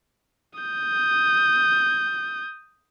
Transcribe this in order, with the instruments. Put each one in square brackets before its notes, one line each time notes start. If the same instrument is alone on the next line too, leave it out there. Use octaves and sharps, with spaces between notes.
[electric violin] D#6 G6